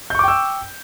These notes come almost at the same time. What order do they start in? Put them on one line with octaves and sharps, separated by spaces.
G6 C#6 D6 G5 E6